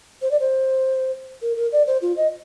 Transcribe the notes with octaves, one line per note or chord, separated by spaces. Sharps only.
C5
D5
C5
A#4
A#4
D5
C5
F4
D#5